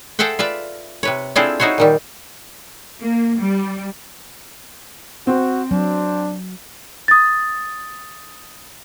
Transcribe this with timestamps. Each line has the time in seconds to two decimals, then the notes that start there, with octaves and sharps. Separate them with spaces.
0.19 G#4 A4 C5 E5 F#5 G5
0.39 F4 B4 D5 E5
1.03 C3 B4 C#5
1.36 C4 D4 E4 F4 G#4 A4
1.60 D#4 E4 F#4 C5 C#5
1.78 A#2 D#3 G3
3.00 A#3
3.38 G3
5.27 C4 F#4
5.71 F#3 D4
7.08 D#6 A6